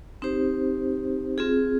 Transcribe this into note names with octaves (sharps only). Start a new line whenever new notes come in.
C4 D#4 G4 C5
C4 F4 G#4